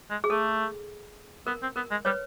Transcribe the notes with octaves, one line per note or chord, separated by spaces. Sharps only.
G#3
G#4
A3 A4
B3 A#4
C4
B3 A#4
G#3
G3 B4 C#5